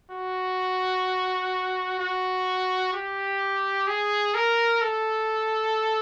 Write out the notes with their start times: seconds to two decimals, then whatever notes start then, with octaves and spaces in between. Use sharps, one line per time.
0.11 F#4
1.99 F#4
2.93 G4
3.87 G#4
4.34 A#4
4.81 A4